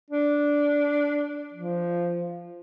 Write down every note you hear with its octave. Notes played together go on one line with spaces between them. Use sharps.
D4
F3